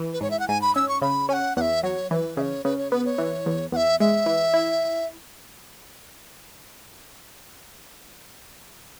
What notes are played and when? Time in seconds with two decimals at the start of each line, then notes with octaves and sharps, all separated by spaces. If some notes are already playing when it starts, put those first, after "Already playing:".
Already playing: E3
0.13 B4
0.21 G#2 C#5
0.31 E5
0.39 F#5
0.48 G#2 G#5
0.62 B5
0.75 C#4 E6
0.89 C#6
1.02 C#3 B5
1.29 C#4 G#5
1.33 F#5
1.56 E2 E5 F#5
1.83 F#3 C#5
2.11 E3 B4 C#5
2.37 C#3 E5
2.42 C#5
2.65 C#3 B4
2.78 C#5
2.91 B3 B4
3.05 C#5
3.18 E3
3.46 E2
3.72 E2 F#5
3.76 E5
4.00 G#3 E5
4.26 E3
4.54 E4